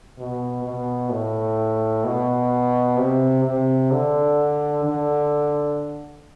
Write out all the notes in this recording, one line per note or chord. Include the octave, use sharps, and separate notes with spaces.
B2
B2
A2
B2
C3
C3
D3
D3